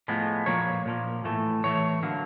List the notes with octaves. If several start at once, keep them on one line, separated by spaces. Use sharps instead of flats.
A2 F3 G#3 B3
A#2 F3 A#3 C#5
A#2 F3 A#3
A2 E3 A3
A2 E3 A3 C#5
D3 F#3 A#3